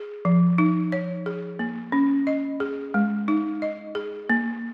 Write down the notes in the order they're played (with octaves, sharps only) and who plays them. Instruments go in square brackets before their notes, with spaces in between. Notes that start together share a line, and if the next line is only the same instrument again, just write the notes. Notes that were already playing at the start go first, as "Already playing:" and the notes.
Already playing: [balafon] G#4
F3
D#4
C#5
G#4
A#3
C#4
D#5
G#4
G#3
D#4
D#5
G#4
A#3